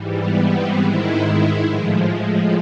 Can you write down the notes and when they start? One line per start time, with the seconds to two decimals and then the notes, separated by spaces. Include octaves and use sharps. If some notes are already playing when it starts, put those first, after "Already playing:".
Already playing: G#2 E3 G3
0.17 B3
0.46 C4
0.75 G#2 D#3 G#3 E4
1.62 A2 F3 G#3